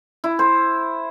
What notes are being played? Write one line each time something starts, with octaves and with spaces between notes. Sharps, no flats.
E4
C5